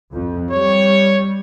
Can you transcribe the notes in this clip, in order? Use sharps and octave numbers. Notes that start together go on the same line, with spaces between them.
F2
G3 C#5